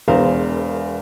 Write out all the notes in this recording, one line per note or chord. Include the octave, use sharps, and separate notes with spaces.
E1 E2 A#4 C5 F5 A#5